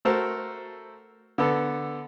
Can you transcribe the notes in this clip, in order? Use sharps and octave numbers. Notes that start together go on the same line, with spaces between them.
A3 F#4 A4 A#4 C5
D3 B3 A4